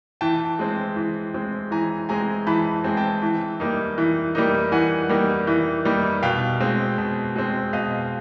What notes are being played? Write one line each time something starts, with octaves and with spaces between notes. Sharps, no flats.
E3 G5 A5
G#3 C4
E3
G#3 C4
E3 G#5 A#5
G#3 C4 G#5 A#5
E3 A5 B5
G#3 C4 G#5
G5 A5
E3
G3 A#3 D#4
E3
G3 A#3 D#4
E3 F#5 G#5
G3 A#3 D#4
E3
G3 A#3 D#4
B2 F5 G5
G#3 C4
B2
G#3 C4
B2 D#5 F5